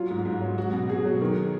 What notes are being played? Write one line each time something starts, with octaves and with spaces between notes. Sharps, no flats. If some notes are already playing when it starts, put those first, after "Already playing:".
Already playing: F#3 F4
G#2
G#2
F#3
F#3 F#4
B2
B2 G#4
F#3
D#3